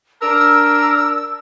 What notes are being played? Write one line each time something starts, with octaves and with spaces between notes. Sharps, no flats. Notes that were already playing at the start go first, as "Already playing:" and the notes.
D4 A#4 E6